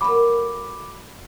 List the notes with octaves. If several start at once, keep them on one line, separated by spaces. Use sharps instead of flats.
F#3 A3 A#3 B5 D6